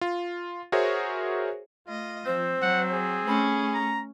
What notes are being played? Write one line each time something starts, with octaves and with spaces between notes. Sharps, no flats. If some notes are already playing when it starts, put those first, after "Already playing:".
F4
F#4 G#4 A#4 C5 C#5 E5
A3 F4 D#5
F3 C4 C5
F#3 F#5
G#4
A3 C#4 B5
A#5